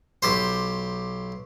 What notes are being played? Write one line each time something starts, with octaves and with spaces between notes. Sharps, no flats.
B1 G4 C5